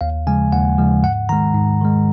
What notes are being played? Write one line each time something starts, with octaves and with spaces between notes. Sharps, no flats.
D#2 F5
C#3 F3 G#3 G#5
D#2 F#5
C#3 F3 G#3
G#2 F#5
D#3 G#3 A#5
G#2
D#3 G#3